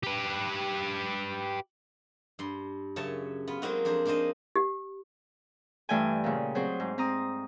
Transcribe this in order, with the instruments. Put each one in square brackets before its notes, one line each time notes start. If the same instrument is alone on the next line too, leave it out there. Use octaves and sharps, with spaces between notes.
[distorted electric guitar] G4 B4
[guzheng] G2 C6
F#2 C#3 C#5 E5 A5
B3 F4
F#3 G#3 A#3 C4 D#4 F#4
F2 D4 G#4 C5
A#3 D4 D#4 C5 D#5
[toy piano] G4
[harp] G2 E3 A3 D4 G5 G#5
A#2 C#3
F#3 C4 G#4 C5
G#2
C4 A#5 D#6